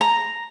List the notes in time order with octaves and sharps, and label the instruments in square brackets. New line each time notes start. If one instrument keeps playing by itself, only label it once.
[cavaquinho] A#5